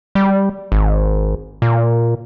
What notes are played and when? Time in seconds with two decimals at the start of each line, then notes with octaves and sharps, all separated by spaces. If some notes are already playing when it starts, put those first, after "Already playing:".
0.15 G3
0.72 G#1
1.62 A#2